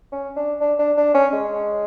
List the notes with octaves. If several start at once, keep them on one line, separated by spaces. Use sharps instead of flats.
C#4
D4
D4
D4
D4
C#4
G#3